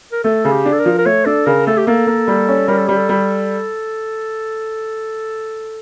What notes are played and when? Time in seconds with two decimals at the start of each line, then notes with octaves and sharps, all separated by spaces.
0.12 A#4
0.24 A3 A4
0.45 C#3
0.51 G4
0.65 D4
0.73 A4
0.79 A#4
0.85 F3
0.98 A#4
1.05 A3 C#5
1.26 D4 A4
1.46 C#3 A#4
1.67 A3 A4
1.77 G4
1.87 A#3 A4
2.07 A#3
2.28 G3
2.48 C#4
2.68 G3 A#4
2.78 A4
2.87 G3 G4
2.96 A4
3.09 G3